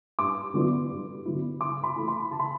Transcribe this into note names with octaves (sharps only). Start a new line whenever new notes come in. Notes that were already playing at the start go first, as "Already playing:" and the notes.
G2 D6
D3 F#3 B3 E4
G2
D3 F#3 B3 E4
C#3 D6
B5
E3 A3 E4
B5
C#3 A5
B5